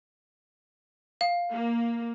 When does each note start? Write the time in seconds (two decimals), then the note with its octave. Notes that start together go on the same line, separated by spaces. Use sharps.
1.21 F5
1.53 A#3